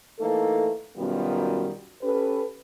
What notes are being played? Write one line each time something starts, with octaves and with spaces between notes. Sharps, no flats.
E3 A3 A#3 D#4 A4
F#2 B2 D#3 G3 B3 F4
C#4 G4 A4 B4